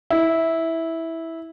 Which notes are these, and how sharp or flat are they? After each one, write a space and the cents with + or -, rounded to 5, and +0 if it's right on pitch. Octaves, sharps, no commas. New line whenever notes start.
E4 -10